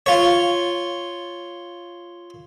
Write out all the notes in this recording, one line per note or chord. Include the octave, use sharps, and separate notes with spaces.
F4 C#5